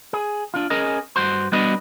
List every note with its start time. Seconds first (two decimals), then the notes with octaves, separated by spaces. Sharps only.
0.13 G#4
0.54 D4 F4
0.70 C#4 G#4 A#4 D#5
1.16 G2 F#4 C5
1.52 G3 B3 D4 F#4 B4 D#5